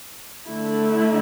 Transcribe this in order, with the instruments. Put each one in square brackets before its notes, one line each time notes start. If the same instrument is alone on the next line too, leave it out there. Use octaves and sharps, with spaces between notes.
[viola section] D3 A3 E4